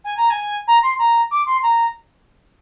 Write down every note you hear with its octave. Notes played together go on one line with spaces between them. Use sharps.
G#5
A#5
G#5
A#5
C6
A#5
D6
C6
A#5